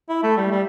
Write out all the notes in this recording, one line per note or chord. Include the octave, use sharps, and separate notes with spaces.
E4
A3
G3
G3